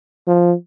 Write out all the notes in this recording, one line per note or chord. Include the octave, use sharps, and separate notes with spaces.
F3